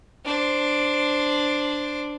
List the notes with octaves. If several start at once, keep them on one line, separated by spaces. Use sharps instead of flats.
D4 C5